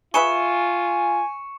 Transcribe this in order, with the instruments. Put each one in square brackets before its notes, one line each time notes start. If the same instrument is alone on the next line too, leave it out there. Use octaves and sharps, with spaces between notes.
[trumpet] F4 [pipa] G#4 B4 E5 [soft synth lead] G#5 [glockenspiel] C#6 C#7 E7